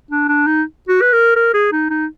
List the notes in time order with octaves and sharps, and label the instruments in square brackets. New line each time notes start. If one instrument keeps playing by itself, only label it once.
[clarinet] D4
D4
D#4
F#4
B4
A#4
A#4
G#4
D#4
D#4